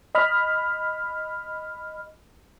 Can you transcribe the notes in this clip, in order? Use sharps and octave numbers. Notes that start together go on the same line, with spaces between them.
D#5 B5 F6